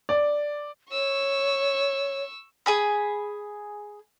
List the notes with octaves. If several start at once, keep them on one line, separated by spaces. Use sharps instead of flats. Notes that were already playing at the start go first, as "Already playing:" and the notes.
D5
C#5 C#6 E6
G#4 G#5 B5